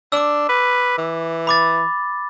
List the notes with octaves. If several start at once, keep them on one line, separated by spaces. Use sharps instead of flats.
D4 D6 E6
B4
E3
B5 D6 A6